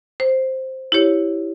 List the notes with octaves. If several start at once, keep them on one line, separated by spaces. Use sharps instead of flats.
C5
E4 G4 C#5